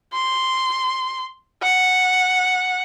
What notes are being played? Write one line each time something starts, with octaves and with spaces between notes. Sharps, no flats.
C6
F#5